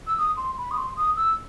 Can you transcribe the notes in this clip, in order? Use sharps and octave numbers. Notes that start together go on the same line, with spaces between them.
E6
D#6
C6
B5
D#6
C6
D#6
E6